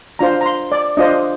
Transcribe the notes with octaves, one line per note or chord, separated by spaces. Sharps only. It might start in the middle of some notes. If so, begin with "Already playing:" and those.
D4 F4 C5 A#5
A#5
C6
D5
D4 F4 C5 D#5